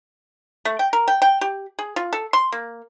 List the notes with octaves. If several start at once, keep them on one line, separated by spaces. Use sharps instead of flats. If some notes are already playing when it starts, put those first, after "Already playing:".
A3
G5
A#4
G5
G5
G4
G#4
F4
A4
C6
A#3